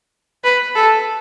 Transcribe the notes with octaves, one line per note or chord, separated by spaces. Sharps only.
B4
A4